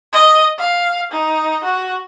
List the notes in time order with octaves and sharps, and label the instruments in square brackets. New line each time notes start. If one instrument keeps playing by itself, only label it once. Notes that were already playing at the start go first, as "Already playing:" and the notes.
[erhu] D#5
F5
D#4
F#4